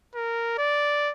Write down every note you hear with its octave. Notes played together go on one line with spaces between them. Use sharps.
A#4
D5